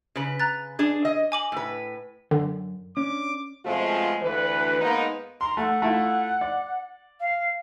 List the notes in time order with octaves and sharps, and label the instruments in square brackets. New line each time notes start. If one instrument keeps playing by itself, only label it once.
[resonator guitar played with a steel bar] C#3 B4
[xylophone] A#5 F#6 A6
[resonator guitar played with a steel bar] D4 G#4
D#5
[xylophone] G#5 D6 F#7
[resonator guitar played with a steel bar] A2 B4
[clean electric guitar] F#2 [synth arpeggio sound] D3
[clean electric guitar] C#4 D4 [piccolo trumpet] D6
[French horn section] B2 F3 G#3 A3 C4 F4
D2 E3 B4
G#2 A#3 B3 D#4
[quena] A#5 [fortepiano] C6
[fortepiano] A3 [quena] F#5
[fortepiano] A3 E4 F4
D5
[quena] F5